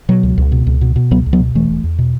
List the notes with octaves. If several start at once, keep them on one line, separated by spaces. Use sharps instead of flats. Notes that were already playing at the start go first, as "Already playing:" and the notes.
B2 F#3
C#2
C#2
B2
C#2
B2
B2
C#2 F#3 B3
C#2
F#3 B3
B2
E1 E3 A3
E1
E2
B2